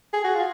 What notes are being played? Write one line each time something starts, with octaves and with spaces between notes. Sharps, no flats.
G#4
F#4
F4